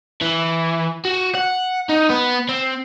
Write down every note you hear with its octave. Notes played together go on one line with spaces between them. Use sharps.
E3
F#4
F#5
D#4
B3
C4